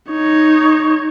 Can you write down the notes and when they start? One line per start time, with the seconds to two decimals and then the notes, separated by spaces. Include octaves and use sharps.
0.10 D#4 C#5